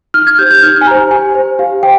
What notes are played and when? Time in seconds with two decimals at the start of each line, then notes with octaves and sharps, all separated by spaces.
0.14 D#4 F6
0.27 G#6
0.39 G4 C5 G6
0.50 G6
0.63 D#4 F6
0.81 G#5
0.87 G4 C5 A#5
1.11 G4 G#5
1.35 C5
1.59 G4 F5
1.83 C5 G5